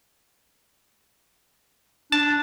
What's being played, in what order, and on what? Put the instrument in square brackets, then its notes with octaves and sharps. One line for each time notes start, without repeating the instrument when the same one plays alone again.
[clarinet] D4 [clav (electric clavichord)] A5